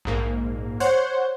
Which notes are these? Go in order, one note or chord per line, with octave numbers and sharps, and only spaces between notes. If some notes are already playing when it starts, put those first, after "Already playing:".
A#1 G#2 A#3
C5 C#5 F#5